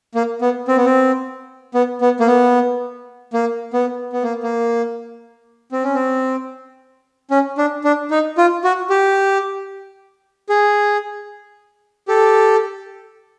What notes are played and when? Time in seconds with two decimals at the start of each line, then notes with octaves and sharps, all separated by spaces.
0.15 A#3
0.41 B3
0.68 C4
0.77 B3
0.85 C4
1.74 B3
2.01 B3
2.20 A#3
2.27 B3
3.33 A#3
3.73 B3
4.13 B3
4.23 A#3
4.43 A#3
5.72 C4
5.84 C#4
5.95 C4
7.31 C#4
7.58 D4
7.84 D4
8.11 D#4
8.38 F4
8.64 F#4
8.90 G4
10.49 G#4
12.08 G4 A4